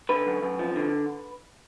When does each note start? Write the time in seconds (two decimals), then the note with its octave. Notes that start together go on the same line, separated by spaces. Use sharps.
0.09 D3 B4
0.27 F#2
0.42 F#2
0.59 F3
0.76 D3